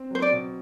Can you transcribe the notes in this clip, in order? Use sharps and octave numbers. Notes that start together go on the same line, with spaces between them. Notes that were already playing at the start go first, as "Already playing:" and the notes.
Already playing: C4
F#3 C5
D5
B2